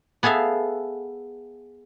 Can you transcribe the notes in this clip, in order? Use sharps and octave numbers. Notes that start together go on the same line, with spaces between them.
B3 G#4 A4 E5 F5